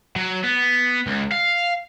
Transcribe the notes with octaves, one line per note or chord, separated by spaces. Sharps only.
F#3
B3
C#2
F5